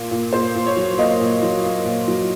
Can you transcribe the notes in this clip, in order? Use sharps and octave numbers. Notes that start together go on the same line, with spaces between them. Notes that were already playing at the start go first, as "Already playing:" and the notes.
Already playing: A#2 A#3
A#2
A#2 C5
A#2
C#5
F#3
A#3 D#5
A#2
F#3
A#3
A#2
F#3